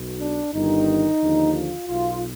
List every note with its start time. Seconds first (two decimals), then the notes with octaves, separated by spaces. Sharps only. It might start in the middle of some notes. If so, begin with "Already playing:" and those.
Already playing: B1 B2
0.21 D4
0.54 G1 G2 D#3 D#4
1.21 D#2 D3 F3
1.54 F4
1.87 B1 B2 F4